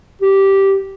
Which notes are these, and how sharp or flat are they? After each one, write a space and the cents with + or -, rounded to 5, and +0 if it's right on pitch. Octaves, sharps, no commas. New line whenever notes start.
G4 -10